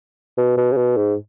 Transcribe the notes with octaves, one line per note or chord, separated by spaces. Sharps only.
B2
B2
C#3
B2
G#2